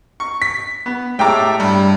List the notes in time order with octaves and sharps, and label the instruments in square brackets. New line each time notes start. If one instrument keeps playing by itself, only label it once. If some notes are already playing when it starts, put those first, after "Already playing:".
[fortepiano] C#6
[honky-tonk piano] B6
[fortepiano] B3
[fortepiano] A2 G#3 D6 [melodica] G4 A4 E5 [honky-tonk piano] G5 A#5
[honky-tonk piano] G2 [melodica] G3